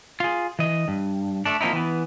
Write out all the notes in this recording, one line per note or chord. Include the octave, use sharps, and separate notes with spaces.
F4 G#4
E3 D#5
G2
A3 D4
F3 A#3 C4 D#4 E4
E3 B3